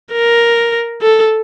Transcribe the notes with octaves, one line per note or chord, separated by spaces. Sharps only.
A#4
A4